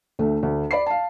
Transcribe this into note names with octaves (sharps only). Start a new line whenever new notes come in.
D2 A3
D2 D3
D5 B5 C7
F5 A5